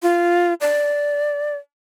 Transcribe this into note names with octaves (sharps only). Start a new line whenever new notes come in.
F4
D5